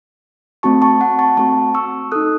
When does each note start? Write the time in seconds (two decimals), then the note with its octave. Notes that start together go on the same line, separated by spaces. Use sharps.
0.63 A3 C4 F#4 A5 C#6
0.82 A5 C#6
1.01 F#5 A5
1.19 A5 C#6
1.37 A3 C4 F#4 A5 C#6
1.74 C#6 E6
2.12 D#4 A4 D#6 F#6